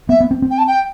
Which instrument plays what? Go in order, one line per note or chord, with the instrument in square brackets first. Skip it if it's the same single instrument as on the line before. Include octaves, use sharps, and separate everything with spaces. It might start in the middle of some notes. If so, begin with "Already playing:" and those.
[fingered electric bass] B3 [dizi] E5
[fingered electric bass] B3
C4
C4
[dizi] G5
A5
G5